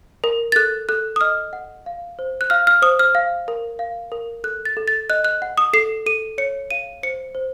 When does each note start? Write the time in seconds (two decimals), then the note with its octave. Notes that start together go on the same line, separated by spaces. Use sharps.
0.24 A#4
0.52 A6
0.56 A4 F#6
0.89 A4 F#6
1.16 D#6
1.21 D#5 F6
1.53 F#5
1.86 F5
2.19 C5
2.41 F#6
2.50 F5 F6
2.67 F6
2.82 C5 D#6
2.99 F6
3.15 F5
3.48 A#4
3.79 F5
4.12 A#4
4.44 A4 F#6
4.65 A6
4.77 A4
4.88 A6
5.10 D#5 F#6
5.25 F#6
5.42 F#5
5.58 D#6
5.73 A4 C7
6.06 A4 D#7
6.38 C#5 C#7
6.71 F5 D#7
7.03 C5 C#7
7.35 C5